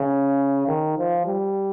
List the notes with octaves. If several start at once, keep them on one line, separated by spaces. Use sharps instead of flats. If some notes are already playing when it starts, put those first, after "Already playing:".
Already playing: C#3
D#3
F3
G3